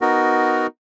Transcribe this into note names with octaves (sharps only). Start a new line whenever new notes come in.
B3 D#4 F#4 A#4